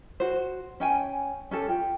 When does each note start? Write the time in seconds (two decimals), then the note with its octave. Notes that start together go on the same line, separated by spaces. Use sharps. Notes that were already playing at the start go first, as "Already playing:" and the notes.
0.20 F#4 C5
0.80 C#4 G5 G#5
1.51 C#4 G4 A4
1.68 F4 G5